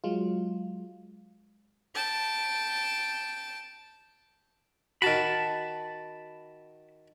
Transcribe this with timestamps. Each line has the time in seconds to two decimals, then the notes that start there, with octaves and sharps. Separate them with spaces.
0.04 F#3 G#3 F4
1.95 G5 A5
5.02 D#3 F#4 A5 B5